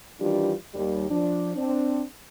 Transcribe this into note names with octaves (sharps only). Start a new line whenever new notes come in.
D#3 E3 G3 D4 F4 G4
D#2 G3
F3 D4
C4 D4